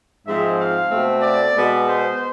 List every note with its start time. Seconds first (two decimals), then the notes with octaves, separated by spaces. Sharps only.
0.26 G#2 F3 G#3 C4 E5
0.58 F5
0.90 B2 A3 C4
1.22 D5
1.55 B2 G#3 B3
1.87 C5